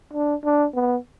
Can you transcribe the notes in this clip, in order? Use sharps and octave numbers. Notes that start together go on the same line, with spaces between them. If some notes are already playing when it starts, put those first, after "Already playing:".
D4
D4
B3